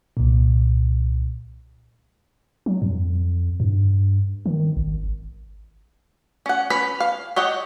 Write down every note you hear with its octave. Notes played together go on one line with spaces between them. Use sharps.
C2 A#2
F#3
F2
G2
D#3
G#1
C#4 F#5
C#4 B4 B5
F5
G4 C#5 D#5 F#5